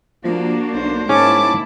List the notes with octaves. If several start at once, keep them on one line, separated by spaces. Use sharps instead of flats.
F3 A#3 D4 F#4
B1 C5
G#2 G#3 A#3 C#4 E4 A5 D6